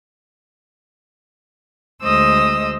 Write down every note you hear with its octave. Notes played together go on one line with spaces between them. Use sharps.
D2 G#3 C5 D#5 D#6 E6